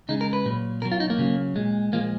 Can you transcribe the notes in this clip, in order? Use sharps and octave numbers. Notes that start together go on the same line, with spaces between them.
C#3 G#3 D#4
A#4
B4
A#2 F#3
B2 F#3 A#4
F4
D#4
A#3
C#3 F#3
A#2 G#3
A#2 F3 G#3 A#3